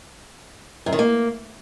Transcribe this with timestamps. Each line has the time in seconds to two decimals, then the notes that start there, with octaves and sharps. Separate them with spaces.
0.86 F#2
0.93 D#3
0.99 A#3